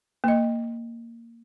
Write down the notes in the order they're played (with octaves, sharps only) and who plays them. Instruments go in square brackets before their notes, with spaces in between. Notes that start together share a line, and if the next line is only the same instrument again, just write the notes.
[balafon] A#3 D#5